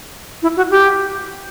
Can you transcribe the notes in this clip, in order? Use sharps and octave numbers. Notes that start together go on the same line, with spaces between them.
E4
F#4
G4